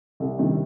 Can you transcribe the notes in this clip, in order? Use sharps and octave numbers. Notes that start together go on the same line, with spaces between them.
C2
C3 D#3 G3 D4